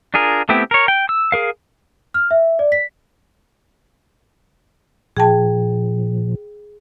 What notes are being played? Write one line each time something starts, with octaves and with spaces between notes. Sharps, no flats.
D4 F4 G#4 A#4
A3 B3 C4 E4 G4
A#4 C#5
G5
E6
G#4 A#4 F5
F6
E5
D5
B6
A#2 F3 G#4 G5 A5